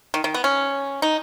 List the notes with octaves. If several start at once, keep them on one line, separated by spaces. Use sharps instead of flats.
D#3
D#3
B3
C#4
D#4